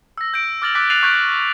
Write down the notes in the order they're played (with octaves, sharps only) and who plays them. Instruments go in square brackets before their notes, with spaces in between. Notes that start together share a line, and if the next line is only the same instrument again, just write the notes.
[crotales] E6 A#6
G6 D7
D6 F6 A6 A#6 F#7
D6 E6 F#6 A6 B6
F#6 A6 C7 D#7 F7 F#7
C#6 F#6 G6 B6 D7